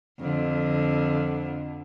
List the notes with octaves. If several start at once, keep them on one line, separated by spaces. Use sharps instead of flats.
F2 D3